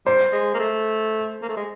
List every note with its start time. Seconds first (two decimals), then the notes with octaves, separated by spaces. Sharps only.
0.06 G3 C5
0.32 G#3
0.54 A#3
0.59 A3
1.42 A#3
1.49 A3
1.56 G#3